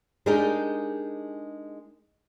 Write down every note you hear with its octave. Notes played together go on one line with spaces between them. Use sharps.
G#3 D4 D#4 G4 G#4 A#4